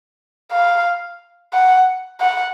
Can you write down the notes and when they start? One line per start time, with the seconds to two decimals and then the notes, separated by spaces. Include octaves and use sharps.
0.52 F5
1.53 F#5
2.20 F#5